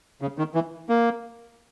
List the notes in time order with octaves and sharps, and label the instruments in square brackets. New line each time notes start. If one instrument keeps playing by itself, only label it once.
[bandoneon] C#3
D#3
E3
A#3